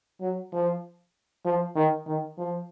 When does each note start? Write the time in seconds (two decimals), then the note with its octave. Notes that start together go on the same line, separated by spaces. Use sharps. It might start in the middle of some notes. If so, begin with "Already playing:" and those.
0.21 F#3
0.53 F3
1.46 F3
1.76 D#3
2.07 D#3
2.38 F3